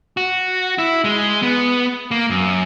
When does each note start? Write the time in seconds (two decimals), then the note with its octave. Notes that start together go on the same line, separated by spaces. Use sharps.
0.17 F#4
0.78 E4
1.04 G#3
1.43 B3
2.11 A#3
2.30 F#2